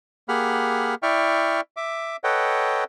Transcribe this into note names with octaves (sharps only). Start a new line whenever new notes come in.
A#3 G4 G#4 F#5 B5 F6
E4 D5 E5 G5 C#6 F6
E5 D6
A4 B4 C#5 D#5 F#5 G5